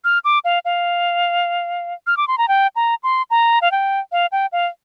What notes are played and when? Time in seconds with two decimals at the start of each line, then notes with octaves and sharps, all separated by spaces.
0.04 F6
0.25 D6
0.45 F5
0.65 F5
2.07 F6
2.17 D6
2.28 C6
2.38 A#5
2.48 G5
2.76 A#5
3.03 C6
3.30 A#5
3.62 F5
3.72 G5
4.12 F5
4.32 G5
4.52 F5